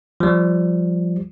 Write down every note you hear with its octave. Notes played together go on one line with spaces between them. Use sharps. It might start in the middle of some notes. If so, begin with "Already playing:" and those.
F3 G3